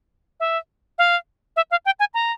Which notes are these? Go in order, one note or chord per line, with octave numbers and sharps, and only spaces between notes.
E5
F5
E5
F5
G5
G#5
A#5